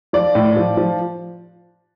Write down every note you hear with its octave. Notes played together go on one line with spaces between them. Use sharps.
F3 D5
A2
F3
F3